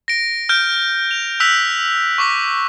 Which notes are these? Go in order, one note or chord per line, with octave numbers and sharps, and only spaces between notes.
A#6 D7
F6 G6 D7
F7
E6 F#6 B6 F7
C#6 D6 B6